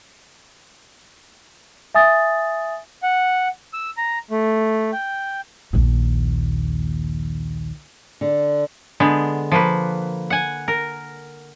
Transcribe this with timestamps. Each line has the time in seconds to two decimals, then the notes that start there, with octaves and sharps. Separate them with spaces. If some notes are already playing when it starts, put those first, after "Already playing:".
1.95 E5 G#5 D#6 A6
3.03 F#5
3.73 E6
3.97 A#5
4.31 A3
4.92 G5
5.73 A#1 D#2
8.21 D3
9.00 D3 G#3 B3
9.51 F3 A#3 B4
10.30 F#5 G#5
10.68 A#4